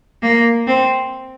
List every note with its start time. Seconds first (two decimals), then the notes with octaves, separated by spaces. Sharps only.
0.23 A#3
0.67 C4